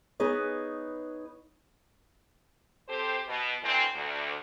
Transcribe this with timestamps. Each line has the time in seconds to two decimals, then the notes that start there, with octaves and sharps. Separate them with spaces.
0.20 B3 D#4 G#4 B4 C#5
2.89 C4 G4 A4 C5
3.28 B2
3.63 D2 E3 C4
3.94 D2